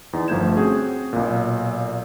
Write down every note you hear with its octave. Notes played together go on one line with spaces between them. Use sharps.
E2 D#4
G1 F3 A3 G6 G#6 E7
C4 C#4 F#4 G#4
B1 A#2